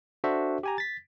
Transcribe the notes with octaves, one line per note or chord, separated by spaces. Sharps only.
D4 F#4 A4 C5 E5
G4 G#5 A#5
A6 B6